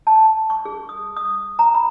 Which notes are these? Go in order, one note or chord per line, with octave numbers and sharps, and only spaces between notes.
A5
C#6
G#4
D#6
D#6
A#5
B5